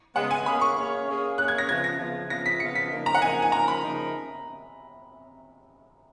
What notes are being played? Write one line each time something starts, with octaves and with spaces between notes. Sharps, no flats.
C#3 G#3 B3 F#5
G#5
A#3 C#4 G#4 C#5 F5 B5
C#6
A#3 C#4 G#4 C#5 F5
A#3 C#4 G#4 C#5 F5
A#3 C#4 G#4 C#5 F5 F#6
G#6
A#6
C#3 F3 B3 F4 G#6
A#6
C#3 F3 B3 F4
C#3 F3 B3 F4 A#6
B6
C#3 F3 B3 F4 C#7
B6
C#3 F3 A#3 D#4 A#4
A#5
F#5
C#3 F3 A#3 D#4 A#4 G#5
G#5
C#3 F3 A#3 D#4 A#4 A#5
B5
C#3 F3 A#3 D#4 A#4